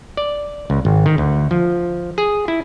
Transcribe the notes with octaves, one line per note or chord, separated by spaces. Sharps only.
D5
C#2
G#1
D#3
D2
F3
G#4
E4